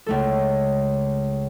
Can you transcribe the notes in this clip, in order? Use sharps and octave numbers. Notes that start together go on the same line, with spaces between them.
C#2 A3 A4